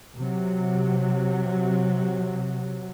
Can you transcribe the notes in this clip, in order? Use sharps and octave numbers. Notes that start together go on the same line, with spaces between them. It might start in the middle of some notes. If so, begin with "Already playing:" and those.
C3 F#3